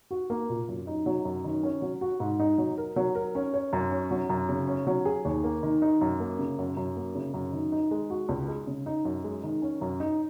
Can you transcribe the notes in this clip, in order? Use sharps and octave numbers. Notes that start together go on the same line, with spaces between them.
F#4
A#3
A#2
F#2
D#4
F#3
F#2
D#3
C#4
F#3
F#4
G#2
D#4
F#3
A#4
F#3
A#4
C#4
C#5
F#2
C#4
F#3
F#2
C#3
C#4
F#3
G#4
D#2
A#3
D#3
D#4
F#2
A#3
C#3
F#2
F#2
A#3
C#3
F#2
D#3
D#4
G#3
F#4
C#2
G#3
C#3
D#4
F#2
G#3
D#3
C#4
F#2
D#4